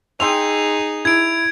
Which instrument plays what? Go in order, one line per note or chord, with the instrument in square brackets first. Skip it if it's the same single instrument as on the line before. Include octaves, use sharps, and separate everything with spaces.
[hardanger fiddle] D#4 G#4 [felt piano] G5 C6 E6 [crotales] F7
[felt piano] E4 [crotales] G#6 D7